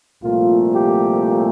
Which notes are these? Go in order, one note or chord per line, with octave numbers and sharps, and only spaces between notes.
C2 A#2 F3 A3 F4
G4